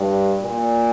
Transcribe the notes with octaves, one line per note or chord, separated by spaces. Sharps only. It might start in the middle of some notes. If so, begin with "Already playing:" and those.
Already playing: G2
A#2